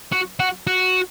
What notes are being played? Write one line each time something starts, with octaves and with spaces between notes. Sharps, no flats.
F#4
F#4
F#4